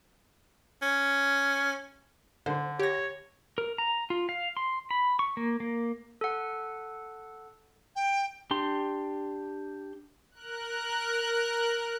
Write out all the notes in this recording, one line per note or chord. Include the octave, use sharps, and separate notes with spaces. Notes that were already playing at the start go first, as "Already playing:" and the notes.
C#4
D3 C5
G4 C#5 A#6
A#4
A#5
F4
F5
C6
B5
C#6
A#3
A#3
A4 F#5
G5
D4 G4 C6
A#4 F#6